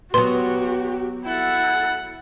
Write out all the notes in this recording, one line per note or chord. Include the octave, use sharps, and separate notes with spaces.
F#3 B3 F#4 G4 C6
E4 A4 F#5